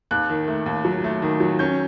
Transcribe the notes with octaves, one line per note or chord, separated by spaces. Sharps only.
D#2 F#6
D#3
A3
D#2
F#3
A3
D#3
F#3
C#4 G6